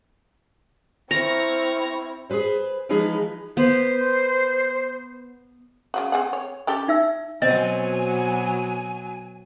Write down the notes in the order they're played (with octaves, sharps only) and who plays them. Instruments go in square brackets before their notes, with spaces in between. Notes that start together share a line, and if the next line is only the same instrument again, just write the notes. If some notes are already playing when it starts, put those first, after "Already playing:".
[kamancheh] C4 E4 [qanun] A#5 [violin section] C#6 F6 A#6
[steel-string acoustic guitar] G#4 A4 B4 C5
E3 F3 G#3 D#4 G#4 B4
[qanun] B3 [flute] C5
[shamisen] C#3 F#3 F#4
C4 G#4 F#5
C#5
C#4 G4 A4
[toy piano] D#4 E5 E6
[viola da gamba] B2 F#3 [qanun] C4 [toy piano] D#5 [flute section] G#5